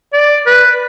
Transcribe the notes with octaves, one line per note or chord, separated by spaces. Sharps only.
D5
B4